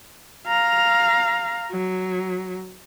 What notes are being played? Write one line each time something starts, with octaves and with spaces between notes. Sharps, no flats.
F5 A#5
F#3